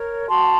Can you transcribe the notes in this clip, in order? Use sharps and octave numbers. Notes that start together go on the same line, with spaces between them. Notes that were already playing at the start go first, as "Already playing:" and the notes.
Already playing: A#4 C#5
F#4 A5 C6